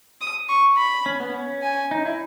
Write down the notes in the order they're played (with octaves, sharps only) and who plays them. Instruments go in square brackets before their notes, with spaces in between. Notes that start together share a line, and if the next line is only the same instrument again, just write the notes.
[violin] D#6
C#6
B5
[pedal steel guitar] C#4
B3
C#4
[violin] G#5
[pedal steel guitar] D#4
E4